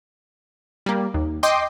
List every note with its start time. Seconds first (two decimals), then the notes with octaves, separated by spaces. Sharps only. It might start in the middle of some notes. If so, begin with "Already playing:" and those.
0.86 G3 A#3
1.14 D#2
1.43 D#5 G5 C6 D6